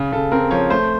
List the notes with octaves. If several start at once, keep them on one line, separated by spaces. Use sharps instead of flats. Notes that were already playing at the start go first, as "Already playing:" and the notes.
Already playing: C#3
C#3 A4
C4 A#4
F3 C#5
A3 C5